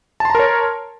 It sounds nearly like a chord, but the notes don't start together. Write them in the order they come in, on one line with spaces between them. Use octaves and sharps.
A5 C6 A#5 A#4 C#5